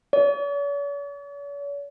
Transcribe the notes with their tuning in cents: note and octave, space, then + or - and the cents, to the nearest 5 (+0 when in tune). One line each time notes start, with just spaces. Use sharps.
C#5 +45